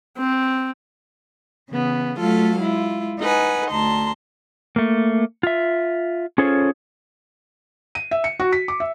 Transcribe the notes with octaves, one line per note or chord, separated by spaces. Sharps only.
C4
C#3 E3 B3
F#3 A3 F4 A4 F5
G#3 E4 F4
D#4 B4 F#5 G#5
D2 A5 A#5 C6
A3 A#3
F4 E5
C#4 F4 G#4 A4 C5 C#5
D#7
E5
C#7
F#4
B6
D6
E5